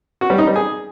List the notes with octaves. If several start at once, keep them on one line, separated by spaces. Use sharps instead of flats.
F#4
G3
D#4
G3
G#4